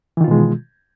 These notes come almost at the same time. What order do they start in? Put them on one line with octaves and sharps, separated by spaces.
E3 D#3 F4 B2 G#3